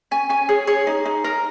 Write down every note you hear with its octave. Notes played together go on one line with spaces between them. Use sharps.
C#4 G#5
C#4 G#5
G#4 C#5
G#4 C#5
D#4
D#4
A#4